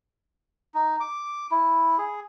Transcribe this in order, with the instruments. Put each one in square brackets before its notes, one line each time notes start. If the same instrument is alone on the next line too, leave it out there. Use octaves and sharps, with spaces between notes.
[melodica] D#4
D6
E4
G#4